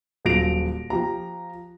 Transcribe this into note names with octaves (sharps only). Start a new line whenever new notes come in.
D#1 F#3 F4 A#6 D7 F7
F3 G4 A#5